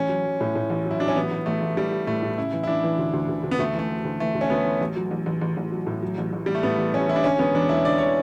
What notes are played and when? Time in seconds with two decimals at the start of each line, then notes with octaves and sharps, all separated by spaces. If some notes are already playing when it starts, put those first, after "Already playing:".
Already playing: A1 C#4
0.09 F#3
0.25 F#3
0.40 A2
0.55 A2
0.70 A1
0.85 F#3
0.91 E4
1.00 F#3 D4
1.08 C#4
1.16 A1 B3
1.31 A1
1.46 A1 A3
1.62 A1
1.77 A1 G3
1.92 A1
2.07 A2 A3
2.23 A2
2.38 C#3 E4
2.53 E3
2.63 E4
2.67 E3 D4
2.84 E3
2.98 D2
3.13 D2
3.29 D2
3.43 D2
3.51 B3
3.58 D2 A3
3.75 E3 A3
3.90 E3
4.04 D2
4.20 E3 A3
4.35 D2
4.41 C#4
4.50 D2 B3
4.65 E3
4.80 A1
4.96 F#3
5.11 A1
5.26 A1
5.41 A1
5.57 A1
5.72 F#3
5.87 A2
6.02 F#3
6.18 A1
6.33 A1
6.46 A1 G3
6.55 A3
6.63 A2 B3
6.78 A1
6.94 A1 C#4
7.08 A1 E4
7.16 D4
7.24 D3 C#4
7.39 E1 B3
7.54 E2 D4
7.69 E1 E4
7.85 D3 D5
7.98 D3 C#5